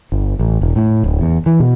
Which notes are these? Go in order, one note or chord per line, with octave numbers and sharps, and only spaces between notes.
G1
A1
E1
A2
D1
E2
E3
B2